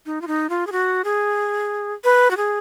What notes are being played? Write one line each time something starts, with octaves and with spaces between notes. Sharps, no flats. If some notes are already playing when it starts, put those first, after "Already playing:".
D#4
F4
D#4
F4
G#4
F#4
G#4
B4
F#4
G#4